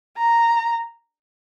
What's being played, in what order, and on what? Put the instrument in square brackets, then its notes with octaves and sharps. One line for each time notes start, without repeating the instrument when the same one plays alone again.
[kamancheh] A#5